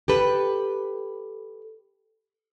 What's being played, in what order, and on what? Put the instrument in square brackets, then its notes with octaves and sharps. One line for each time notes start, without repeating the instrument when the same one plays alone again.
[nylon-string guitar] G4 A4 B4